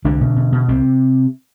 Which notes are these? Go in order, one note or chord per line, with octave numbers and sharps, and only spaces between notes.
C2 D3 D4
B2
B2
B2
C2 C3 C4